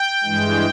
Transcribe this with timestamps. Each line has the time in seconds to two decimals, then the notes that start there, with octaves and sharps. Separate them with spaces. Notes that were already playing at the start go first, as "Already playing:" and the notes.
Already playing: G5
0.24 G2 E3 G#3